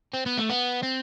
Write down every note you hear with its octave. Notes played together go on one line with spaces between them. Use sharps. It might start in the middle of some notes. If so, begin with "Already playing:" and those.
C4
B3
A3
B3
C4